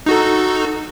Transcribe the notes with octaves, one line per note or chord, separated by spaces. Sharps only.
D#4 F#4 A4